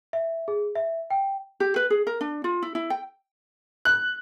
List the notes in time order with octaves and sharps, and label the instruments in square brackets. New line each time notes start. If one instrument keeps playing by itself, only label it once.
[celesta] E5
G#4
E5
G5
[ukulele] G4
B4
G#4
A#4
D4
F4
E4
E4
G5
[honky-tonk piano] F#6